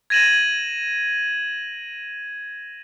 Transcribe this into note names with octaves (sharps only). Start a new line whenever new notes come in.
G#6 A#6 D#7 E7 F#7